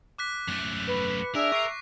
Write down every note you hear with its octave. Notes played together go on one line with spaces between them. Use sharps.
D6 F#6 B6
F#2 A3
B4
D4 G#4 A#4 E5
C#6 A#6 C7